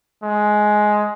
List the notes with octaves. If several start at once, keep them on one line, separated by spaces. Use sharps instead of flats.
G#3